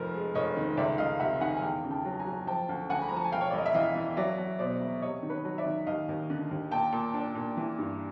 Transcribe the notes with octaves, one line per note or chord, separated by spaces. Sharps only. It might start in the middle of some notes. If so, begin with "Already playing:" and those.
Already playing: F1 F3 A#4
G#3
F1 C#5 D#5
D#3
C#2 D5 E5
C#2 D#5 F5
C3 E5 F#5
D#3 F#5 G#5
G#5
E2 F5 G5
C#3
G5 A5
F#3
G#5 A#5
F#3
F3 G5 A5
D2
D2 F#5 G#5
B5
F3 A#5
A5
G#5
E1 F5 G5
C#5
D5
E1 D#5
E5
E3 D#5 F5
E3
F#3 D5 E5
F#3
B2 C5 D5
E1
C3 C#5 D#5
D#3
B4 C#5
F#3
D5 E5
D#3
D#2 D#5 F5
D#2
D3
D#2
A#2 G5 A5
A#2
D4
A#2
E3
G2